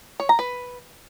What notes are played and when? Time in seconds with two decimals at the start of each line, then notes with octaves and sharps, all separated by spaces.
0.20 C#5
0.29 A#5
0.39 B4